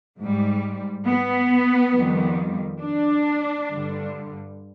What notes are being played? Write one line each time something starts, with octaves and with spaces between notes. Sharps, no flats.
G#2 G3
B3
F2 D#3 G3
D4
G2 D3 G3